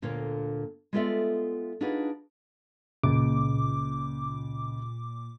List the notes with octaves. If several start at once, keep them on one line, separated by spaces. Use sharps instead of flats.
D2 A#2 D3 A#3 C#5
G#3 B3 F4 A4 D5 E5
D4 D#4 F4 F#4 G#4 B4
C#2 A#2 D6